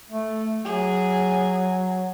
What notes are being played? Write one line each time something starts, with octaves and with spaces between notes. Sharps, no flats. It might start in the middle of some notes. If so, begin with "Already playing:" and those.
A3
F#3 G#4